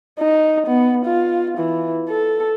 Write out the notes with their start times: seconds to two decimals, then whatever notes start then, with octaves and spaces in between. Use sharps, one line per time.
0.19 D#4
0.67 B3
1.05 F4
1.58 E3
2.10 A4